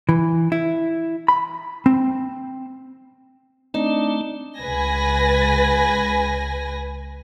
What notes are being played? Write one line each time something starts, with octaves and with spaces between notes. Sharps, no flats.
E3
E4
B5
C4
A3 C4 D4 D#4
C#2 B4 G#5 A#6